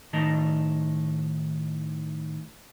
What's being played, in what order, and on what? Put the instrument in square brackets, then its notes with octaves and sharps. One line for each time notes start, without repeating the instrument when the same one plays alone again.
[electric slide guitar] A2 D#3 D#5 A5 A#5